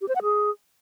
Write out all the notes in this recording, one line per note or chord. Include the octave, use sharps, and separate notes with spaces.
G4
C5
F#5
G#4